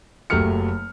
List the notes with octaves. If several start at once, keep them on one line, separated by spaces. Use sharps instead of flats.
F#1 F#3 A3 G4 F6 C#7